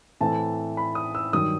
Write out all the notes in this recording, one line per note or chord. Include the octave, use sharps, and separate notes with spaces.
A2 E3 A3 C4 A5
B5
D#6
E6
G2 D#3 F#3 D#6